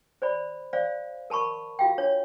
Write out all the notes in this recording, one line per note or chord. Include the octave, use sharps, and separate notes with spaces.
C5 D5 B5
C5 D5 F5
A#4 A5 B5 C#6
F4 F#4 F5 G5
D4 C#5